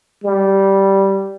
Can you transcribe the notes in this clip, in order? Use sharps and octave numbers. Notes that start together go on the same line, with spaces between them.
G3